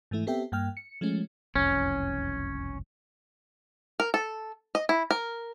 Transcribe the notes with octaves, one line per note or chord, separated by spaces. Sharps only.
G#2 E3 A3 E4
B3 C4 G4 A4 E5 G5
G2 A#3 G5 F6
C#7
F3 G#3 A3 C#4
F#1 C2 F2 C#4
A#4
A4
D#5
E4
A#4